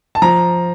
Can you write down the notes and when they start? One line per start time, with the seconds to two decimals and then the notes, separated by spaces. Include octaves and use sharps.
0.15 A5
0.22 F3 A#5